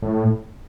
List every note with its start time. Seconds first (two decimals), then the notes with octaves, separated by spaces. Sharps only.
0.02 A2